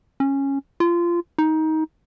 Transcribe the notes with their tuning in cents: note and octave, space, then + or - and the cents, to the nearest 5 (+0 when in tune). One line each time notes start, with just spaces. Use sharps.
C#4 -10
F4 -20
D#4 +20